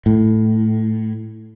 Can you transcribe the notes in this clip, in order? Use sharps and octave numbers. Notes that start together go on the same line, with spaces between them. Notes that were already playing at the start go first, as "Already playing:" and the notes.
A2